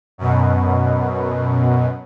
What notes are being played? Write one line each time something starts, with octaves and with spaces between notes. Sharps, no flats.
F#2 B2